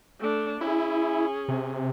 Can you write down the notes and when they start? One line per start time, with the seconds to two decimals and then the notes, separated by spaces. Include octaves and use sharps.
0.19 A3 D4
0.61 C#4 E4 G#4
1.48 C3